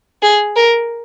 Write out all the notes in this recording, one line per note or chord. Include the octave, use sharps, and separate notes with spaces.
G#4
A#4